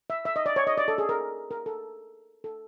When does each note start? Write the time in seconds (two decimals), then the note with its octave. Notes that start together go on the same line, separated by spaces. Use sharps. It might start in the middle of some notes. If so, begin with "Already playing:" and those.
0.10 E5
0.25 E5
0.36 D#5
0.46 D5
0.56 C#5
0.67 D#5
0.77 D5
0.88 A4
0.98 G#4
1.09 A#4
1.51 A#4
1.66 A4
2.44 A4